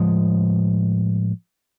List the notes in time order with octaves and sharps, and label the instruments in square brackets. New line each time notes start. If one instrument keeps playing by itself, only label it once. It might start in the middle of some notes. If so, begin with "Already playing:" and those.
Already playing: [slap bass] A2 F3 G#3